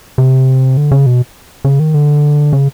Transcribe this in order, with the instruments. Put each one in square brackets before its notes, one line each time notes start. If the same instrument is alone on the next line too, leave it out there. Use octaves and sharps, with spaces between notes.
[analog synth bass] C3
D3
C#3
B2
C#3
D#3
D3
C#3